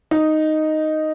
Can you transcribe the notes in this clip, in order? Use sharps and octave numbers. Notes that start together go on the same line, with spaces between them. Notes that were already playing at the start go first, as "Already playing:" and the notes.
D#4